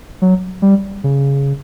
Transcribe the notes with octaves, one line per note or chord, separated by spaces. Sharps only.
F#3
G3
C#3